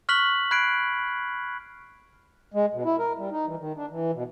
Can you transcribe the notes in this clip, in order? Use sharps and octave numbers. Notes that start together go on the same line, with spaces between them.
C#6 F6 F#6 B6 F#7
B5 F#6 G#6 C7 D7
G#3
B2
E4
A#4
G3
D#4
E3
D#3
D4
E3
B2